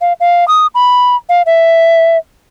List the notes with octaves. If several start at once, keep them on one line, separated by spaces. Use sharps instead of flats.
F5
F5
D#6
B5
F5
E5